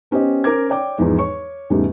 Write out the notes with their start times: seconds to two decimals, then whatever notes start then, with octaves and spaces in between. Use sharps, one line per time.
0.11 B3 C#4 G4 C5 D#5
0.44 C#4 A#4 C5 D6 G#6
0.69 C#5 D5 G5 D6
0.98 E2 G#2 E3 F3 G#3
1.18 C#5 C#6
1.70 E2 G#2 C#3 G3 A3